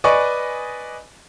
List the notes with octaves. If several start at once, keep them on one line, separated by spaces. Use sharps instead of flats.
B4 D5 D#5 G#5 C#6